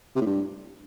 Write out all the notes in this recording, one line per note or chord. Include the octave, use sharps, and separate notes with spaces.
C3
A2
G2